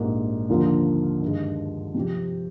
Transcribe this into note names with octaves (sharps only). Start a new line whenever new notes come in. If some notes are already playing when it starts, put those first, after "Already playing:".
Already playing: A#1 G#2 G3 A#3
D#2 D3 F3 A#3 F4
G2 D#3 G#3
C3 F3 C4 G4